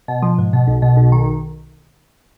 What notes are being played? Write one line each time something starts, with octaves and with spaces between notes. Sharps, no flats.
B2
F3
G#2
B2
B1
B2
B1
D#3